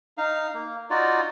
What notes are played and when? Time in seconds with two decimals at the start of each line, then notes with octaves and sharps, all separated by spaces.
0.18 D#4 F5
0.54 A#3
0.90 D#4 F4 F#4 D5